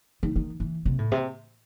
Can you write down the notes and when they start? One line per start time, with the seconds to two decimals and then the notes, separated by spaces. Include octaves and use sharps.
0.23 D#3
0.36 D#3
0.60 E3
0.85 C3
0.98 A2
1.12 C3